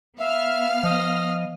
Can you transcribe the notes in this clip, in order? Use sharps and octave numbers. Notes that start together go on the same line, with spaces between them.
B3 E5 F5 F6
F3 D#5